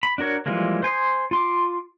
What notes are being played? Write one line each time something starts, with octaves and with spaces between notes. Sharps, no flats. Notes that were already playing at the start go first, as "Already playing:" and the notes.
B5
D4 F#4 A#4 C#5
E3 F3 G3 G#3 A#3
C5 G#5 C6 D#6
F4 C6 D6